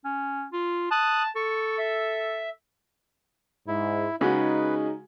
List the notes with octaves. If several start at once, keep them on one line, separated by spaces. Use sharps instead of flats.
C#4
F4
A5 D#6 F#6
A4 C#6
E5
G#2 E4
C#3 G#3 D#4 F#4 B4